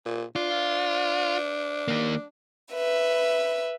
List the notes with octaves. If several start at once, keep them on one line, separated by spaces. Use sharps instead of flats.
A#2
D4 F4
D#3 A#3
B4 E5